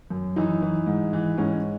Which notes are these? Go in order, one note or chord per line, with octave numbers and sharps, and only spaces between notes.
F#2
E3 D#4
E3
G#2
E3
G#2 C#4